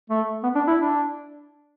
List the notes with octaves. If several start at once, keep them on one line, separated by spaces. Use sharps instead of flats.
A3
B3
D4
E4
D4